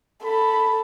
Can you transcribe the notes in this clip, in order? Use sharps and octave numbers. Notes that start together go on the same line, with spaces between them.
A4 B5